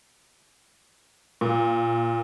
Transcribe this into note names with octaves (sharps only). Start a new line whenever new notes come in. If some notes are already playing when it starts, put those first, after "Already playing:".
A#2